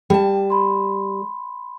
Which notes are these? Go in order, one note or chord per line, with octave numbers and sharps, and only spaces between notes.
G3 G5 A5
B5 C6